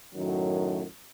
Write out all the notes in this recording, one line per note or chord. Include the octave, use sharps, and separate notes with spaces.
F#2 A2 D#3 F#3 F#4